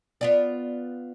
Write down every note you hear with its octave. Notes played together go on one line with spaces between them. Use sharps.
B3 F4 D5